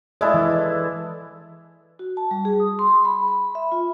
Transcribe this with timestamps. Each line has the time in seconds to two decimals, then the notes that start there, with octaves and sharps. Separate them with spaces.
0.21 G#3 E4 A4 D5
0.34 E3
1.99 F#4
2.17 A5
2.31 G3
2.45 G#4
2.60 D#6
2.79 C6
3.05 B5
3.28 B5
3.55 E5
3.72 F4